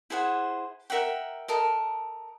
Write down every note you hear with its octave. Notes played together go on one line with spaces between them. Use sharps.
E4 G#4 C5 F#5
A#4 E5 F#5 G5
A4 A#4 D#5